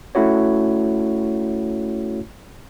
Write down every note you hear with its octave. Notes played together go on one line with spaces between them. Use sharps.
A3 C#4 E4 F#4 C#5